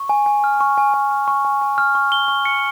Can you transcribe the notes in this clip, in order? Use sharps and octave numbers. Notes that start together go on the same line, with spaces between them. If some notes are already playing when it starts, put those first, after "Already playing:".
Already playing: C#6
G#5
G#5
F6
C#6
G#5
G#5
F6
C#6
G#5
G#5
F6
C#6
G7
C#6
C#7